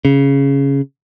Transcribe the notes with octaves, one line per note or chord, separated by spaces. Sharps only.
C#3